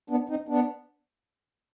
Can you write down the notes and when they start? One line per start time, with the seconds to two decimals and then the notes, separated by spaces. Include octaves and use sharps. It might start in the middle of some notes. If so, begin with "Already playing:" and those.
0.10 B3 D4
0.29 C4 D#4
0.48 B3 D4